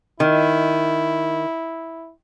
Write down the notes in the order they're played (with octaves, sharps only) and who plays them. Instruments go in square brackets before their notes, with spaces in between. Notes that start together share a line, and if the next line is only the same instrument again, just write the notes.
[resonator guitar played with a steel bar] D#3 [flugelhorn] E4